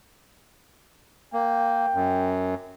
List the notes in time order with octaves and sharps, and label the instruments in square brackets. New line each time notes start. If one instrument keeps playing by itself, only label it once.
[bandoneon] A#3 [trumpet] G5
[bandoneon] F#2